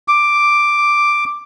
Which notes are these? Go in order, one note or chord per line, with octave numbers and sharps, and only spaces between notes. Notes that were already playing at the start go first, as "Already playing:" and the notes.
D6